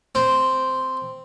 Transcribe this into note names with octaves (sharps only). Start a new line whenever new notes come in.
C4